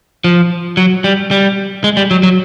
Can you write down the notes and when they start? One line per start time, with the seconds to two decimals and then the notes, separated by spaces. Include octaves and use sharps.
0.24 F3
0.77 F#3
1.04 G3
1.31 G3
1.84 G#3
1.97 G3
2.11 F#3
2.23 F#3